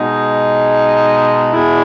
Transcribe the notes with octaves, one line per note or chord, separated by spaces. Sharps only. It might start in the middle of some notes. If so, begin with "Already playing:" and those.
Already playing: B2 G#3 D#4
E2 B2 G#3 E4